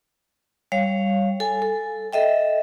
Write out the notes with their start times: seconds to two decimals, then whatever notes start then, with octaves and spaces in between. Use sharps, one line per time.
0.72 G3 C#5 F5
1.40 A4 G#5
1.62 A4
2.13 A4 D#5 E5 G5